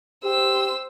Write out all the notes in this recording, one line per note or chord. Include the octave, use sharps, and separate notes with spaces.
G4 C5 E6